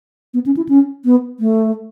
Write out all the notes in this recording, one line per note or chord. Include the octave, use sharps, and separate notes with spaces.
B3
C#4
E4
C#4
B3
A3